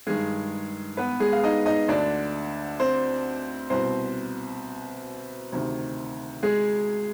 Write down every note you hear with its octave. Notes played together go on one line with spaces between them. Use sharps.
G2 D#3 G#3 G#4
B3 B4
G#3 G#4
F5
D#4 D#5
D#4 D#5
D2 D3 D4 D5
C4 C5
C2 B2 C4 C5
D2 C3 D#3
G#3 G#4